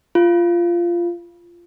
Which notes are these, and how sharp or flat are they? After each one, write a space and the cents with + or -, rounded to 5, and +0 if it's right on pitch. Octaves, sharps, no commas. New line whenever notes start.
F4 -15